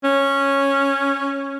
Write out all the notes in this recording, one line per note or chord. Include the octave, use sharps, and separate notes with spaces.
C#4